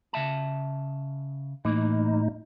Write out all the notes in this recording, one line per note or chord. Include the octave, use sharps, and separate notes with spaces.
C#3 E5 A5
A2 E3 A#3 D#4